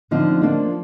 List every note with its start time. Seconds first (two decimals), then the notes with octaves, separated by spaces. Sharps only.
0.11 D3 F3 C4 D#4
0.42 F3 A#3 D4